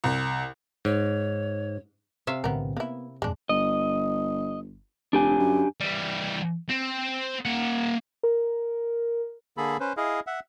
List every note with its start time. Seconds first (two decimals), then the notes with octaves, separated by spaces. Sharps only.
0.04 C2
0.85 G#2 C#5
2.27 C3 E5 F5
2.44 B1 A2 D3 B3 A#4
2.77 A#3 B3 E4
3.22 E1 F2 G#2 G#3 D4
3.49 G1 D#5
5.13 F1 D4 G4 G#5
5.39 F#2
5.80 E3 G3
6.69 C4
7.45 A#3 F#5
8.23 A#4
9.57 D3 A#3 G#4 A4 B5
9.80 C#4 B4 C5
9.97 E4 G#4 D#5 F5
10.27 E5 F#5